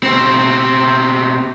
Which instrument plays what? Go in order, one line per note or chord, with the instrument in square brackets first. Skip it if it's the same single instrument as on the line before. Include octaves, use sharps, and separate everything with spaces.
[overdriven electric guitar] B2 C4